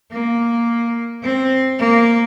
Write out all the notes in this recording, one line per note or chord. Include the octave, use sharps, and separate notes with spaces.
A#3
C4
A#3